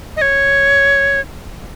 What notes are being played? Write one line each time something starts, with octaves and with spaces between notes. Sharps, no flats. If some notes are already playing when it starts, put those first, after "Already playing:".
D#5
C#5